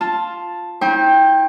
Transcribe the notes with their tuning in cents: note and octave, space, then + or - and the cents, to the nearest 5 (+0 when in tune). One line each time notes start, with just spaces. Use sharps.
F4 +0 A5 +0
E4 -40 C5 +45 G5 +5